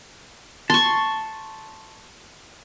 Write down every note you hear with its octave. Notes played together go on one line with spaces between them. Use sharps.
A5 C6 C#6